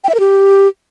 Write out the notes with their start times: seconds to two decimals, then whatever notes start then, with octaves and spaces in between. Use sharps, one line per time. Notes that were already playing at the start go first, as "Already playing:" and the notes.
0.04 G5
0.09 E5
0.14 A#4
0.20 G4